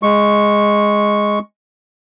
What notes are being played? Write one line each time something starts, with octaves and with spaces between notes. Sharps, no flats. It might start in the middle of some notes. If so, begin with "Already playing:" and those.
G#3 C#6